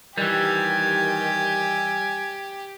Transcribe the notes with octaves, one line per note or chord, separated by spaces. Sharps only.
D#3 E3 G3 G4 G#5